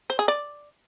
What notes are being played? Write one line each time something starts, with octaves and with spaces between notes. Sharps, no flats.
C5
G#4
D5